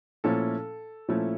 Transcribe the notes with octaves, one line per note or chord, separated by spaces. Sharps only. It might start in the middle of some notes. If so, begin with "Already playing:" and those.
A#2 F3 A3 C#4 E4 A4
A#2 F3 A3 C#4 E4